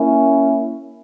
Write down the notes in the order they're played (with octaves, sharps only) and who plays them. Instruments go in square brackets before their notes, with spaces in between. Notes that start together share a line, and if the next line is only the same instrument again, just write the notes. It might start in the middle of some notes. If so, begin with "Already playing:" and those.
Already playing: [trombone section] A#3 C#4 E4